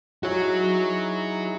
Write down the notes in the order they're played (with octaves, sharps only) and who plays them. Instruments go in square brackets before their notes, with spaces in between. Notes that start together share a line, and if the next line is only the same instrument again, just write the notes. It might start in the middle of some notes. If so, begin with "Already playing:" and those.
[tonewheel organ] D#4 E4 G#4 [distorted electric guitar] F#4 C#5